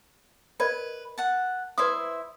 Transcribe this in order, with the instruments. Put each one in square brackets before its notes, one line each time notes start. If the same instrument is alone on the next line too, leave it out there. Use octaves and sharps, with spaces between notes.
[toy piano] A#4 D5 D#5 [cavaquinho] B4
[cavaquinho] F#5 A5
[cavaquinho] E4 C5 E5 [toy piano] B4 D5 D#6